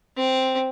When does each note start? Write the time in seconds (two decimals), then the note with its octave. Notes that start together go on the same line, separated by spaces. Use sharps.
0.17 C4